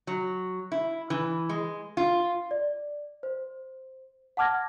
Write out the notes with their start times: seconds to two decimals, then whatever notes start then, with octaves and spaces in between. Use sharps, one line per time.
0.07 F#3
0.72 E4
1.10 E3
1.49 G#3
1.97 F4
2.51 D5
3.23 C5
4.37 F#5 A5 D6 F6 G#6 A#6